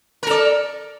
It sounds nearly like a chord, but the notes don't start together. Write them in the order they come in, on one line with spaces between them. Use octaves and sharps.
A#4 A4 D5